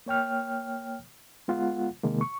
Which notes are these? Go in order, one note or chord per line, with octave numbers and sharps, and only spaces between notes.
A#3 C#5 G5 F6
G#3 B3 F4 F#5
C3 D#3 G#3 A#3
C#6